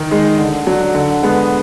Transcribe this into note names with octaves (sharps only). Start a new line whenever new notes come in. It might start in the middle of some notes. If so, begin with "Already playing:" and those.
Already playing: D#3
G#3 D#4
D3
F#3 D4
D3
G#3 B3